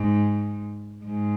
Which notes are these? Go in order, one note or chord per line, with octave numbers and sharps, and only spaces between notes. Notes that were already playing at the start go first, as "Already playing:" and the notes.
Already playing: G#2
G#2